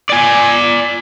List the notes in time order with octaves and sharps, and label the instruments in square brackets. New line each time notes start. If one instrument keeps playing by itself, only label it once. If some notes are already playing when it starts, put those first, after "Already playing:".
[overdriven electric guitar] D5 G#5